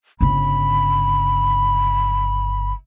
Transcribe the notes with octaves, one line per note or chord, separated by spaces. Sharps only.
G1 C#3 B5